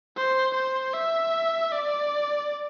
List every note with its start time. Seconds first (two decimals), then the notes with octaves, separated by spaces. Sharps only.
0.16 C5
0.54 C5
0.93 E5
1.72 D5